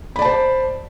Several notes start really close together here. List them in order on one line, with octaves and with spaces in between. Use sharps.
B5 D5 A5 C5